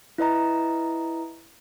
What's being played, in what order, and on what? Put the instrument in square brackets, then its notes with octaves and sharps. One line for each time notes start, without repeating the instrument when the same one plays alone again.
[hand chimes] E4 B4 D#5 A#5